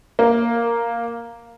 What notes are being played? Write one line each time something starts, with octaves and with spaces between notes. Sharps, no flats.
A#3